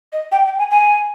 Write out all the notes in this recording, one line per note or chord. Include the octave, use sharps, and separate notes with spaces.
D#5
G5
G5
G#5
G#5